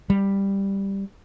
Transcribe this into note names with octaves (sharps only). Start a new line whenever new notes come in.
G3